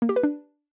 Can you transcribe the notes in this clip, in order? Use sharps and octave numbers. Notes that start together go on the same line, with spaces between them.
A#3
G4
B4
D4